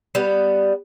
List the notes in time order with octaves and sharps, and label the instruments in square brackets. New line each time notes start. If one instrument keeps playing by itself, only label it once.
[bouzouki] G3 B3